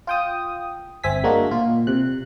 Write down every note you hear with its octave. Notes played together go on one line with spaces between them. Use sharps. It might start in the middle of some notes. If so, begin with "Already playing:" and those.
F4 G5 D#6
G1 C4 E5 G#5 B6
G#3 A#3 D4 F#4
A#2 F4
C3 F#6